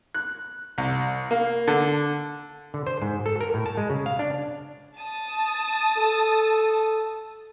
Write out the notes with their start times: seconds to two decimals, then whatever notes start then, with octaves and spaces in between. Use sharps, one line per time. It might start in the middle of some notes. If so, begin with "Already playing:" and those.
0.15 F#6
0.78 C2
1.31 A#3
1.68 D3
2.74 D3
2.87 C5
3.02 G#2
3.26 A4
3.41 A#4
3.54 A2
3.66 A5
3.77 G#3
3.90 C#3
4.06 F5
4.19 D4
4.97 A5 D#6
5.97 A4